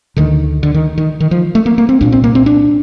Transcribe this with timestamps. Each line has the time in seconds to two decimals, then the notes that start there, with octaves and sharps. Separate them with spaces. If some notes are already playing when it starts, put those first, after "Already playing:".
0.16 D2 D3 D#3
0.63 D3
0.74 D#3
0.98 D#3
1.20 D#3
1.31 F3
1.55 A3
1.66 A#3
1.78 A#3
1.89 C4
2.01 C2 A#2 D4
2.12 C4
2.24 A#3
2.35 C4
2.46 D4